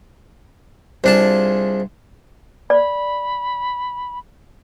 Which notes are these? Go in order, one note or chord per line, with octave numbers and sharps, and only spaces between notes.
C2 D4 F4 G#4 C5 A5
D5 B5